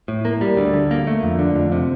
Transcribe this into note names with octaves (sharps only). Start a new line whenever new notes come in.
A2
A#3
G3
D2
D3
A#3
A3
F2
D3
F2
C3